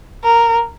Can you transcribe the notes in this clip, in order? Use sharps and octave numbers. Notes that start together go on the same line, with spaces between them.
A#4